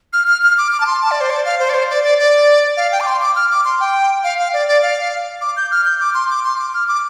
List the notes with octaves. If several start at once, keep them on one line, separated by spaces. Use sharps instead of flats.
F6
F6
F6
D6
D6
A5
C6
A5
D5
C5
D5
F5
C5
D5
C5
D5
D5
D5
F5
G5
D6
C6
D6
F6
D6
C6
G5
F5
F5
D5
D5
F5
D6
G6
F6
G6
D6
C6
D6
C6
D6
F6
D6